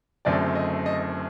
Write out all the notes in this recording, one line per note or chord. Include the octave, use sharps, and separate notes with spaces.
F#1 F#2 D3 A3 C4 D5
D#5
D#5